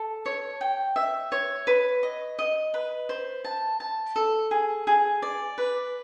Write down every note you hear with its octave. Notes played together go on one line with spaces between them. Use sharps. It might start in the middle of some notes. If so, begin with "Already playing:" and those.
Already playing: A4
C#5
G5
E5
C#5
B4
D#5
D#5
B4
C5
A5
A5
A4
G#4
G#4
D5
B4